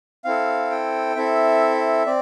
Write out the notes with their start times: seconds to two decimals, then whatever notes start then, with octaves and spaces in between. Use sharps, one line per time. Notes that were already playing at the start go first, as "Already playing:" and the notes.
0.25 C4 E4 A4 F5
0.71 G5
1.15 C4 E4 A4 E5
2.06 C4 D5